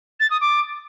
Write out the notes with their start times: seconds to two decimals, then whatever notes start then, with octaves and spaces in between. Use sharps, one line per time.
0.20 A6
0.31 D#6
0.41 D6